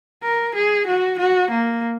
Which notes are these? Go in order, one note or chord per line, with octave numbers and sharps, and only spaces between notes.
A#4
G#4
F#4
F#4
A#3